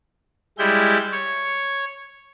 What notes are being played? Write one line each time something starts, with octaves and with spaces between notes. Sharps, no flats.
G3 G#3 E4 G6
C#5